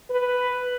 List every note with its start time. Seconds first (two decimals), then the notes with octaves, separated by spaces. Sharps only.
0.11 B4